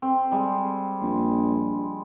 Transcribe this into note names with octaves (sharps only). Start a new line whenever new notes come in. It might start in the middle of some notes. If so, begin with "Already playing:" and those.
C4
G3 G#3
A#1